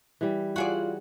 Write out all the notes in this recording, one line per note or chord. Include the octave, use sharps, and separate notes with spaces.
E3 G3
F4 F#4 G#4 D5